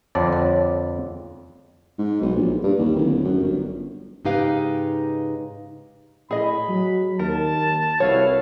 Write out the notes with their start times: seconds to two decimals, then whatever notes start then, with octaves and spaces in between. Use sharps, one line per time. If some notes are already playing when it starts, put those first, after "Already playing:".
0.15 F2 D3 C#5 D5 A5
0.32 C#5
1.98 G#2
2.21 B1
2.35 A#1
2.64 G2
2.79 D#2
2.96 D1
3.24 F#2
3.43 G1
4.25 G#2 C#3 D#4 G4 B4 F5
6.31 A2 G#4 D#5 B5
6.69 F#3
7.19 D#2 A#4 A5
8.00 C2 E4 F#4 B4 C#5 F5